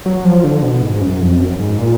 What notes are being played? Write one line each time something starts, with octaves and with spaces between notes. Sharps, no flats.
F#3
F3
D3
B2
G#2
F#2
F2
F#2
G#2
A#2